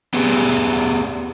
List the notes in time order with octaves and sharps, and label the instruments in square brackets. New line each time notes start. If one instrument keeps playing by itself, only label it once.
[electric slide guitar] B3 G4 G#4